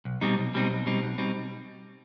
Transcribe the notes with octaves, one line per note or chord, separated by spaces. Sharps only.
B1
B2 G3 C4 D#4
B1
B2 G3 C4 D#4
B1
B2 G3 C4 D#4
B1
B2 G3 C4 D#4